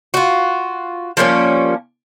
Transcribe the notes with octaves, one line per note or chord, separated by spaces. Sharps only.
F4 F#4
F3 G3 A#3 C#4